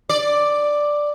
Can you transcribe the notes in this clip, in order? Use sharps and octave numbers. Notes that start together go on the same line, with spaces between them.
D5